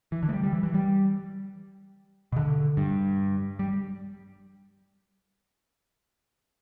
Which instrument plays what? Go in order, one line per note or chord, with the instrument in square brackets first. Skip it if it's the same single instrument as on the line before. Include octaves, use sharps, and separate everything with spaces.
[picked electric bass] E3
D3
A3
G3
G3
E3
E3
G3
B2
D3
G2
G3